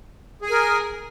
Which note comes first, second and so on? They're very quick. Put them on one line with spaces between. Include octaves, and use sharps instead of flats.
G#4 G#5 A#4